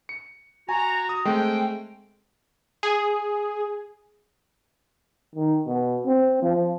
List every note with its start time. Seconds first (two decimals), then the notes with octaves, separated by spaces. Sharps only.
0.09 C#7
0.69 F#4 G#5 A#5
1.09 D#6
1.25 G#3 A3 C4 G5
2.83 G#4
5.35 D#3
5.66 B2
6.06 C4
6.42 F3